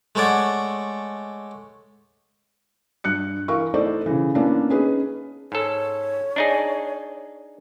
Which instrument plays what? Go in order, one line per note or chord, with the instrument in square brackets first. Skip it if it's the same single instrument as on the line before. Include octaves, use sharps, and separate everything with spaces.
[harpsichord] G#3 A3 C#5 D5 F#5
[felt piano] G2 F#6 C#7
E3 A#4 F5 C#6
A3 D#4 E4 C5 D5
C#3 E3
A#3 B3 C#4 D4 E4
C#4 D#4 G#4 B4
[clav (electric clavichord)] G#2 A4 [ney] C#5
[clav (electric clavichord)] D4 D#4 G#4